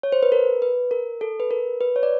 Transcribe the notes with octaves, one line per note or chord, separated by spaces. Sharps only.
C#5
C5
B4
A#4
B4
A#4
A4
B4
A#4
B4
C#5
D5